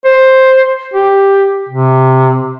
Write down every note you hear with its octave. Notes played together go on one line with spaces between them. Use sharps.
C5
G4
C3